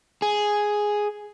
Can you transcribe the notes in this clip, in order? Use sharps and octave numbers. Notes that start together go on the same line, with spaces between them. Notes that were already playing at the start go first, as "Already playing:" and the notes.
G#4